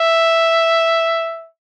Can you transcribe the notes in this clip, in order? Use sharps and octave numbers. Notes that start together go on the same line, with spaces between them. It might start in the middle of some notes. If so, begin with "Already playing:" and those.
Already playing: E5